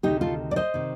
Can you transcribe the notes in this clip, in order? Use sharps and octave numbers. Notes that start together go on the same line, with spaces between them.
D2 C3 D#3 D#4 G4
F4 A4
D5
C5 D#5
C3 D#3